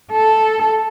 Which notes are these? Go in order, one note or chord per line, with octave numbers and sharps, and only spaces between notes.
A4